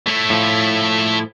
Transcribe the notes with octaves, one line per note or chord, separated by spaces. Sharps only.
A3 E4
A2 F3